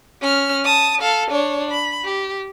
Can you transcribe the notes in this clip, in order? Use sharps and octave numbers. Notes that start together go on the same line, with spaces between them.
C#4 F6
A5 D#6
A4 F5
D4 C#5
B5
G4